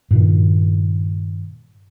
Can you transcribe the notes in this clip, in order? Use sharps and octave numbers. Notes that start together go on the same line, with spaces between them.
G2 A#2 D#3